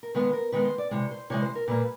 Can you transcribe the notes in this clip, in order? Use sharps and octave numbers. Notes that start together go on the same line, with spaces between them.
A#4
D#3 G#3 B3 B4
A#4
D#3 G#3 B3 B4
C5
D5
C3 E3 G#3 C#5
C5
C3 E3 G#3 C#5
C5
A#4
A#2 G3 A#3 B4